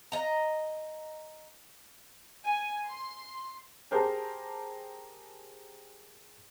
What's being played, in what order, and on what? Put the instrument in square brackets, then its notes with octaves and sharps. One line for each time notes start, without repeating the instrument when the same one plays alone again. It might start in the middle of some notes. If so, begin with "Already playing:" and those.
[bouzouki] D#5 A#5
[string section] G#5
C6
[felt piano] G4 G#4 A#4 C5 A5